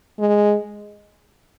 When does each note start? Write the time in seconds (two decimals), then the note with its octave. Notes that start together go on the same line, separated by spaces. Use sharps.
0.19 G#3